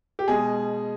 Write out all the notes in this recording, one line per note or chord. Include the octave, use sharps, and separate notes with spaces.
G4
B2 G#3 G#4